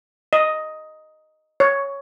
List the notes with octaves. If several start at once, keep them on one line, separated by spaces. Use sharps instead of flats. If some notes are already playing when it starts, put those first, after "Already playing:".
D#5
C#5